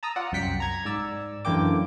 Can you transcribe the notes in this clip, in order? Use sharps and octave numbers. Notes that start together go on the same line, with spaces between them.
A5 A#5 D#6 E6
F4 D5 F#5
C2 F#2 G5 B6 C#7
A#5 G#6
G#2 D5 E6
F#2 D3 E3 A#3 G5 D6